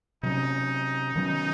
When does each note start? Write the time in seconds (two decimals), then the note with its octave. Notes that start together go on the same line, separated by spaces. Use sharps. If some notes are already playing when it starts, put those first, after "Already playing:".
0.23 C3 F#3 C#4 D#4
1.16 D#3 F#3 C#4